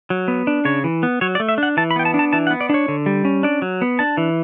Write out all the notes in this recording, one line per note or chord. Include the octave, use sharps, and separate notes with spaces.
F#3
B3
D4
C#3 C#5
E3
B3
F#3 C#5
D5
A3
E5
D4 F#5
E3 A5
B5
B3 G5
A5
D4
A5
E3 A5
F#5
B3
D5
D4 C#5
D3
G3
C#4
D4 D5
F#3
B3
D4 A5
E3